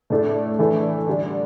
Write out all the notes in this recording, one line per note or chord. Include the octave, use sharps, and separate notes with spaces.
A2 A3 D4
E3 A3 D4
D3 G3 D4